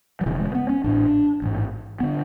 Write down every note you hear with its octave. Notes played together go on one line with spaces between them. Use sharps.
F#3
E1 E2 C#3 E3
G#3
B3
C#4
A1 A2 D4
A1 G#2
D3 B3